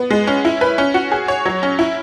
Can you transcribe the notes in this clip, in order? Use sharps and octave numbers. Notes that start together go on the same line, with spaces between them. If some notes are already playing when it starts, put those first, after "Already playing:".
Already playing: B3
G#3
C#4
E4
B4
C#4
F#4
G#4
C#5
F#3
C#4
E4